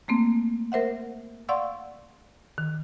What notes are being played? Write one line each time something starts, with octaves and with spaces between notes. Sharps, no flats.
A3 A#3 C4
A#4 C5 E5 F#5
D5 F5 F#5 C6 C#6 E6
D#3